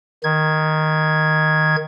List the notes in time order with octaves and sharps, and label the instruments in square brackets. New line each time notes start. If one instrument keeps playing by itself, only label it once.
[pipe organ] D#3 G#6